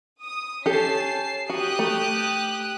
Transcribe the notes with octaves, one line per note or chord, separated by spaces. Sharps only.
D#6
C#4 G4 A4 A5 C7
F#4 G4 D#6 F#6
A3